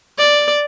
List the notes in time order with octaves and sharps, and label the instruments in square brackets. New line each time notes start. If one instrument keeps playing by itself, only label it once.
[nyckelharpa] D5